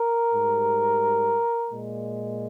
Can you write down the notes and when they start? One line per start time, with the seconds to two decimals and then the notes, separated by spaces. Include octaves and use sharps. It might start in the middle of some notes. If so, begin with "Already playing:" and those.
Already playing: A#4
0.33 G#2 G3
1.68 A#2 G#3